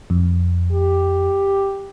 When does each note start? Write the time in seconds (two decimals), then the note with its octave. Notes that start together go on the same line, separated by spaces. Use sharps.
0.10 F2
0.72 G4